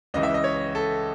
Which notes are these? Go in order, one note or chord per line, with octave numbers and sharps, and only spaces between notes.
C#2 C#3 E3 D#5
E5
D#5
C#5
A4